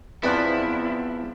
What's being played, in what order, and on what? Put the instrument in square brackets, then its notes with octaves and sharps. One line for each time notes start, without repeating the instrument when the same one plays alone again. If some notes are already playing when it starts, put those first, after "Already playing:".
[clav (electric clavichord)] E2 F3 [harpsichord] B3 [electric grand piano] C4 D5 F#6 [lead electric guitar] E4